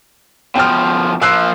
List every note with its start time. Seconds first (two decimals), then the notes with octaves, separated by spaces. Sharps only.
0.56 B2 F3 G5 F6
1.22 F3 A#3 E6 F#6 C7